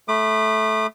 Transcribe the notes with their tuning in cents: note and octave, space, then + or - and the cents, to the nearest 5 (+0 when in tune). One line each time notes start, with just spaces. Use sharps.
A3 -10 B5 +0 D6 +45